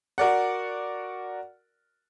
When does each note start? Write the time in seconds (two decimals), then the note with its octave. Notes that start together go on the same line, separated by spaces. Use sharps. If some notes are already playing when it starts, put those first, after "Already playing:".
0.18 F#4 A#4 D5 F#5